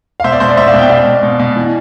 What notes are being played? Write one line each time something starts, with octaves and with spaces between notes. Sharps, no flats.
F5
B2 C5 E5
D5
B2 C5
D5
B2 C5 E5
D5 F5
B2
E5 G5
B2 D5 F5
B2
B2
B2
E3